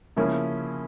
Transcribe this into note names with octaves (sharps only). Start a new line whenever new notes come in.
C#3 F3 A#3 C#4 E4